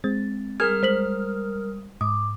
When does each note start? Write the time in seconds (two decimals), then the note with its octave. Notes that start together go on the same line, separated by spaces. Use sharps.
0.04 G#3 C4 A6
0.60 G3 G#4 A#4 D#6 F6 G#6
0.83 G#3 C5 B6 F#7
2.01 G#2 D6 D#6